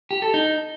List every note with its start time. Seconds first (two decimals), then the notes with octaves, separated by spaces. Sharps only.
0.11 G4
0.22 A4
0.34 D#4